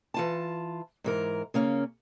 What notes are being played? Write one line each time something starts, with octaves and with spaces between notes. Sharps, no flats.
E3 F4 A5
G#2 E3 A#4
C#3 A#3 C#4